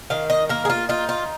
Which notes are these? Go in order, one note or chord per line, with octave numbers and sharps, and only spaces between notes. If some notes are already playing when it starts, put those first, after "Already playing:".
D#3 F5
D#5
A#3 A#4
G#4
F4
D#4 F4
F4